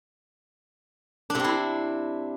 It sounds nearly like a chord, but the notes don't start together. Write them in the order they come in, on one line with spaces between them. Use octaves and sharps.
D4 C3 C4 E4